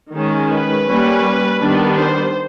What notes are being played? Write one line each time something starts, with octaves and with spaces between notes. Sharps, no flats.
D#3 G#3 C#4
B4
G3 A#3 C#4
D#3 G3 B3 D4
C5